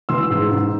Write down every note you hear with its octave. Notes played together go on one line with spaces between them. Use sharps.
E3 C6 E6
G#2
G#2